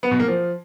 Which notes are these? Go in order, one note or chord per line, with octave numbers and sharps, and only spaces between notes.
B3
B2
A#3
F3